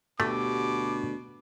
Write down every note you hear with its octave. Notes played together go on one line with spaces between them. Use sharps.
D2 B2 D3 A3 G4 D6